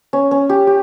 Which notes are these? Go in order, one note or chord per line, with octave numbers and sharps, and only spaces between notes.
C#4
C#4
G4
G4